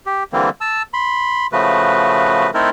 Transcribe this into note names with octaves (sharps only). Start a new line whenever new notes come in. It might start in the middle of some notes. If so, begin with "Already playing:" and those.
G4
D3 E3 G3 A#3 C4
A5 E6
B5 C6
C#3 F3 A3 F#4 B4
A3 C4 D#4 E4 A4 A#4